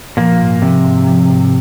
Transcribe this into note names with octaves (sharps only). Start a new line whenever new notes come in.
A#2 F3 A#3
G#2
C3 F3
G#2
F3
G#2